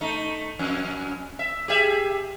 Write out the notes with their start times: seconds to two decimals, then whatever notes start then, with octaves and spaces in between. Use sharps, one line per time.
0.01 A3 D#4
0.59 F2
1.39 E5
1.68 G4 G#4 E5